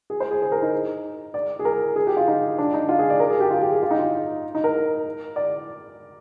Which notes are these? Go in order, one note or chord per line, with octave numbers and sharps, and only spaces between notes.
G#4
C5
G#4
G#4
A#4
D#4
D5
G#4
A#4
G#4
G4
F4
D#4
D4
D#4
F4
G#4
D5
A#4
G#4
G4
F4
G4
G#4
F4
D#4
F4
D#4
A#4
D5